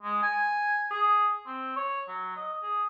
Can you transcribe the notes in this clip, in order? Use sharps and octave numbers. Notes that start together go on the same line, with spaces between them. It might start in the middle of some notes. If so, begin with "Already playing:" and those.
G#3
G#5
G#4
C4
C#5
F#3
D#5
G#4